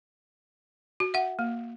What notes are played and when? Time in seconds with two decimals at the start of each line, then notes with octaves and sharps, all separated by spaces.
1.00 F#4
1.14 E5 F#5
1.39 A#3